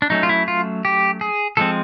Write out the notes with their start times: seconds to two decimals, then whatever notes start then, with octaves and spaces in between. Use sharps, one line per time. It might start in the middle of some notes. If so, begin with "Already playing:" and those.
0.02 D4
0.10 F#3 A3 C#4 D#4
0.23 F4
0.29 E4
0.48 F4
0.85 G4
1.21 G#4
1.57 F3 G#3 C4 A4